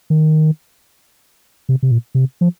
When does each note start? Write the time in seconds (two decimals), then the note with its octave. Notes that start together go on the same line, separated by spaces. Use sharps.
0.10 D#3
1.69 C3
1.83 C3
1.91 A#2
2.15 C3
2.41 F3